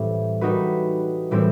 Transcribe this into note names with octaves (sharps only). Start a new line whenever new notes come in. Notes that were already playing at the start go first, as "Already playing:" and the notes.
Already playing: A2 E3 G3 C4
G3 D#4 F#4 B4
A2 E3 G3 C4